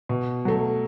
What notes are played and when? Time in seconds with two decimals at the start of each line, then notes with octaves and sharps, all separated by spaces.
0.09 B2
0.45 F#3 A3